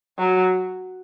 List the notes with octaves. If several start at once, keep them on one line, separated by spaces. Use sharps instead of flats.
F#3